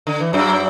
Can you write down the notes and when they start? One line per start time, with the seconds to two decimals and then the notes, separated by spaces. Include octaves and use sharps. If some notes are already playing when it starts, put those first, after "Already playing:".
0.07 D3
0.20 E3
0.33 F#2 F#3